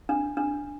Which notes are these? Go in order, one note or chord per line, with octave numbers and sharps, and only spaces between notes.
D4
D4